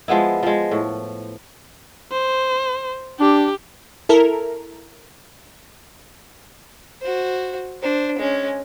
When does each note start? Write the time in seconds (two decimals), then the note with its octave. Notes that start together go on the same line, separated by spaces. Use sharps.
0.08 F3 G#3 B3 E4
0.43 F3 G#3
0.71 A2
2.12 C5
3.20 D4 G4
4.09 E4 A4 A#4
7.02 F#4 C5
7.82 D4 C5
8.18 G#3 C#4